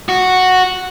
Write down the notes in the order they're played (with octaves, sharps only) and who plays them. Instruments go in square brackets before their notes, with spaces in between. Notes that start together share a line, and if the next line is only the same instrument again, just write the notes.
[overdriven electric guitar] F#4